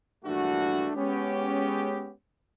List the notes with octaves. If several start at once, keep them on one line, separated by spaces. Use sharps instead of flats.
A#1 G2 E3 A3 D4 F#4
G#3 B3 C#4 G4